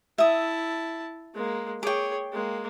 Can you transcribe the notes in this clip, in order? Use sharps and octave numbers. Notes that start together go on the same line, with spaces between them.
E4 E5 A5 D#6
G#3 A#3
G#4 C#5 G5 D6
G#3 A#3